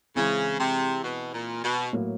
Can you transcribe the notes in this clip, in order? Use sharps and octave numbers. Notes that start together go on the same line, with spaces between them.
C#3 E3 G#3 C4 E4
C3
B2
A#2
B2
A2 F#3 A#3